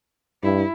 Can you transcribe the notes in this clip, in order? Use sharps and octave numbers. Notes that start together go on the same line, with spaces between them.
G2 E4